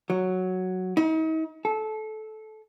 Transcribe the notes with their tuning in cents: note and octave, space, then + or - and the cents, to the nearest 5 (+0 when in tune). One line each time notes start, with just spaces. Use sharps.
F#3 +0
D#4 +40
A4 -20